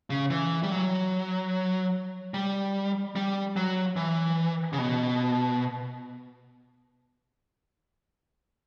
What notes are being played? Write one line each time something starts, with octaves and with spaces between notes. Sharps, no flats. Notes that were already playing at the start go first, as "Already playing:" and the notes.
C#3
E3
G3
F#3
G3
G3
F#3
E3
C#3
B2